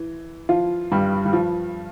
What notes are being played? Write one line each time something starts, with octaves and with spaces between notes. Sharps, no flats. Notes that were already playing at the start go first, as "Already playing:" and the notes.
Already playing: E3
F3 F4
G2 G3
G3
F3